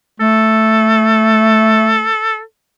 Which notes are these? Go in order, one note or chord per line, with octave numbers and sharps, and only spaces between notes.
A3 A4